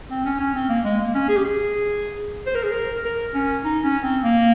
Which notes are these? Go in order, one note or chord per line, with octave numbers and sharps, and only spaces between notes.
C4
C#4
C#4
C4
A#3
G#3
A#3
C#4
G#4
G4
G#4
C5
A#4
G#4
A#4
A#4
C#4
D#4
C#4
C4
A#3